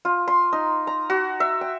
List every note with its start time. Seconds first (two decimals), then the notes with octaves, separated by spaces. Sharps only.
0.05 F4
0.28 C6
0.53 D#4
0.87 A#5
1.10 F#4
1.40 E5
1.61 G5